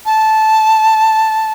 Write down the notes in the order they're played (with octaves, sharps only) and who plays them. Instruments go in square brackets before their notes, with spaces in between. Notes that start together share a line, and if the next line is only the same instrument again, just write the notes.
[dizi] A5